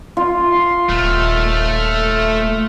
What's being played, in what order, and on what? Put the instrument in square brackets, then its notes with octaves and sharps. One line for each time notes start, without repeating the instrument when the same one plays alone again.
[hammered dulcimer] F4
[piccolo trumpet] C6
[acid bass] D#1 [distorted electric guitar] A3 [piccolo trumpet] F6